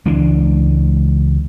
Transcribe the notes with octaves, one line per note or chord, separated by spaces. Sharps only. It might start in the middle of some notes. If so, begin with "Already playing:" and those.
C#2 E3 G#3 D4